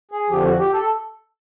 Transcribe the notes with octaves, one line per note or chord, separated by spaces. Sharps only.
G#4
F2 D3 F3 G4
F#4
G4
A4